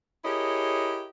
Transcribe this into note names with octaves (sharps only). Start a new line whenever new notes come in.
E4 G4 G#4 A#4 C#5 D#5